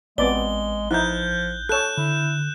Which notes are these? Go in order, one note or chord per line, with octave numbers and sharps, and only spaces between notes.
A1 G#3 B3 C4 D5 G7
F3 D#4 E4 F#6 G6
A4 C#5 F#6 E7
D3 E4